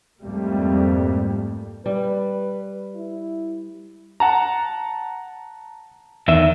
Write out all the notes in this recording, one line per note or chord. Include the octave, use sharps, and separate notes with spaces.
F2 G#2 G3 A3 A#3
G3 B4
E4
F#5 A5 A#5
E2 D#3 E5